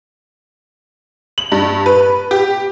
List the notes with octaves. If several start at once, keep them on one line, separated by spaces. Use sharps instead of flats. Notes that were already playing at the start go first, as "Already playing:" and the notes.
F#7
G2
B4
G4